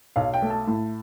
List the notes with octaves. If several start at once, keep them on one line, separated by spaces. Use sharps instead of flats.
B1 F5
G5
A3
A5
A2